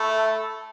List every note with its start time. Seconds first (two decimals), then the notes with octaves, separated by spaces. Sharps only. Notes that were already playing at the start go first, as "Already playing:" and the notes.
Already playing: A3 E4
0.17 A4